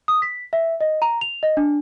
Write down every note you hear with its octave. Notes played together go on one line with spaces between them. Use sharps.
D#6
B6
E5
D#5
A#5
F7
D#5
D4